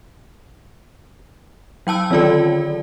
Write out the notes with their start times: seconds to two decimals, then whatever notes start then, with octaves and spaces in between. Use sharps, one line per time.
1.87 F#3 G5 A5 E6
2.10 D3 D#3 F#3 F4 A4 D5